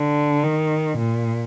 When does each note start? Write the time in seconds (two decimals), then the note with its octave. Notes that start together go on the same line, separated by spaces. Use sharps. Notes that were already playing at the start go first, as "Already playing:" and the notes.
Already playing: D3
0.43 D#3
0.98 A#2